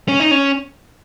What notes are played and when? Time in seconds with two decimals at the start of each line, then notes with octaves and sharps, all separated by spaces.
0.08 C#4
0.20 D#4
0.31 C#4